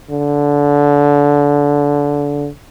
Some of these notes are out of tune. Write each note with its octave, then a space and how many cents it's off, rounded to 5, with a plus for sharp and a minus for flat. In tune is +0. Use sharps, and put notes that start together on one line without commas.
D3 -20